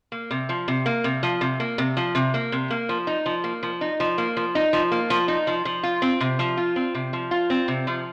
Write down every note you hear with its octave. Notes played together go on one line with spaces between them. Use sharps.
A#3
C3
F3
C3
A#3
C3
F3
C3
A#3
C3
F3
C3
A#3
C3
A#3
F3
D#4
F3
A#3
F3
D#4
F3
A#3
F3
D#4
F3
A#3
F3
D#4
F3
F3
F4
C4
C3
F3
F4
C4
C3
F3
F4
C4
C3
F3